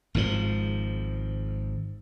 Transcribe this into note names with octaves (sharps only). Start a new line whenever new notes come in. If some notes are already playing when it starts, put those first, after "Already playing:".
G#1 G#2 C#3 F3